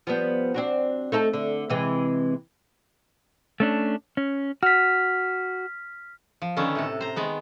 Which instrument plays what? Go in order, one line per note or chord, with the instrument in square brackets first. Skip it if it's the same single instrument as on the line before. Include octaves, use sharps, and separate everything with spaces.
[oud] F3 G3 B3
C4 D4 F#4
A3 D#4 A4
D3
C3 E3 G#3
[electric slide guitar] A3 C#4 D4
C#4
[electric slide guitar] F#4 [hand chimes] F6 B6
[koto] F3
D3 D#3 B3 C#4 A4
A2 C3 A4
C5 A#5
D#3 G#3 B3